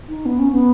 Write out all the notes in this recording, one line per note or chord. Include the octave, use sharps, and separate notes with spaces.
D#4
B3
C#4
B3